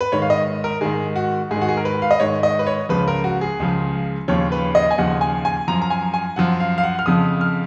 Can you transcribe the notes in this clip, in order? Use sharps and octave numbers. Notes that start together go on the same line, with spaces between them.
B4
G#2 D#3 C#5
F5
D#5
A#4
G#2 D#3 G#4
F#4
G#2 G#4
D#3
F#4
G#4
A#4
B4
F5
D#5
G#2 D#3 C#5
D#5
B4
C#5
C#2 C#3 F3 B4
A#4
F#4
G#4
C#2 C#3 F3
D#2 C#3 F3 C#5
B4
D#5
G#5
D#2 C#3 F3 F#5
G#5
G#5
F#2 F3 A#5
A#5
G#5
G#5
F#2 F3 F#5
F5
F5
F#5
F6
F2 C#3 F3 D#6
F6